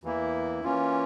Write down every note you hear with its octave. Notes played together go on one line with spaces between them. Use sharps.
E2 E3 A#3 E4
E3 A#3 C#4 F4